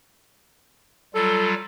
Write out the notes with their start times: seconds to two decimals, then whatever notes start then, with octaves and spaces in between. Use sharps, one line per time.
1.14 F#3 G3 F4 A4